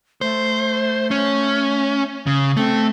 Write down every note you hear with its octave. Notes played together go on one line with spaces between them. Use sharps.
A3 C5
C#4
C#3
A3 C4